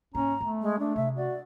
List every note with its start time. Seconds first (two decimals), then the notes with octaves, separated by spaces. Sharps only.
0.15 G#2 A#3 C#4 A#5
0.41 A3 B3
0.61 G#3
0.79 A3 D4
0.96 C3 E5
1.16 F#4 D5